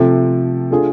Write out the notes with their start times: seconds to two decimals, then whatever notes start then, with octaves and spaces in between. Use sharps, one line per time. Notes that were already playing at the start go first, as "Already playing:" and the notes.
Already playing: C3 F3 A3
0.70 A3 D4 F4 G#4